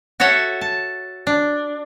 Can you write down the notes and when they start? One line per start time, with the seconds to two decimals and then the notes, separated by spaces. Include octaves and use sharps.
0.20 F#4 A4 C#5 E5 F#5
0.61 A5
1.27 D4